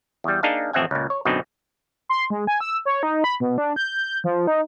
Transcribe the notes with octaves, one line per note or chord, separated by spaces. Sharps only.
E2 G3
A#3 D4 D#4 G#4 F5 A5
A1 F2 C4 E5 F#5 G#5
C#2 A#2
C#5
F#2 B2 D3 C4 D#4
C6
G#3
G#5
E6
C#5
D#4
B5
B2
D4
G6
F3
D#4